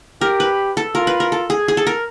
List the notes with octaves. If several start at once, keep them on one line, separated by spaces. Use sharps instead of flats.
G4 A#4
B4
A4
F4 A#4
B4
A#4
A4
G#4
G#4
A4
A#4